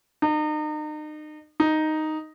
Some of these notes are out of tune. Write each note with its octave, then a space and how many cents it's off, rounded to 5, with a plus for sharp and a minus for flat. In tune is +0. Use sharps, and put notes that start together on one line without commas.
D#4 -35
D#4 +0